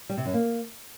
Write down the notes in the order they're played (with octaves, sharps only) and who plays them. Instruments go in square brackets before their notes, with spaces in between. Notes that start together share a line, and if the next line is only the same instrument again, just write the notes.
[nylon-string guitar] G3
C3
F#2
A#3